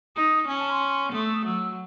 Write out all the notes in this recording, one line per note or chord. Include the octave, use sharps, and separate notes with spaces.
D#4 D#6
C#4 G#5
A5
C6
A3 D#6
E6
D#6
F#3 E6